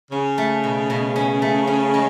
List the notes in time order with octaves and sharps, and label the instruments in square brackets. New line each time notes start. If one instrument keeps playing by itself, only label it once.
[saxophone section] C#3 [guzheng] C#4
[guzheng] A3
B2
B2
C#4
A3
C#4
G#3